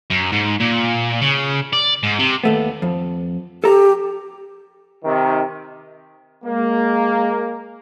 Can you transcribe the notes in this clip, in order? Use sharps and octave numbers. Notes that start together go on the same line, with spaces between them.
F#2
G#2
A#2
C#3
D5
G#2
C3
D#2 A3 B3
F2
G4 A4 A#5
C3 D#3
G#3 A#3